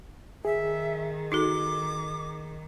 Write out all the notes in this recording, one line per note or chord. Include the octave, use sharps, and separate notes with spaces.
D#3 G#4 E5
D#4 F#4 A4 D6